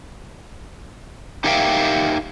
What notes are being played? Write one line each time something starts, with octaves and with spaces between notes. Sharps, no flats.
D#4 G4 A#4 E5 F5 G5